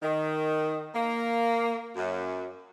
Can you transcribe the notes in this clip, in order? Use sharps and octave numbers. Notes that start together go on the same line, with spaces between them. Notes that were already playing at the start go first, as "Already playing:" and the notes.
D#3
A#3
F#2